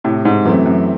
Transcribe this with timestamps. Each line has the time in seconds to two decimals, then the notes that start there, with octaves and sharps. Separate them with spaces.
0.04 A2 C3
0.25 G#2
0.45 F#2 E3 A3 C4
0.66 F#2